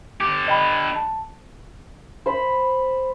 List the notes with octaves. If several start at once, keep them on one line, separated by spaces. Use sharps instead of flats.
D3 G4 D6
D#5 G5 B5
A5
C5 B5